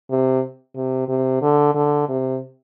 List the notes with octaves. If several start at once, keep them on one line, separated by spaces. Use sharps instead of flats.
C3
C3
C3
D3
D3
C3